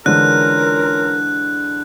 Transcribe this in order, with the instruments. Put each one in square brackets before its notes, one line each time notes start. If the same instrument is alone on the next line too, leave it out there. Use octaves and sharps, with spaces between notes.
[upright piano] D3 E3 G#3 [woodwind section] C#4 F4 A#4 [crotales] F#6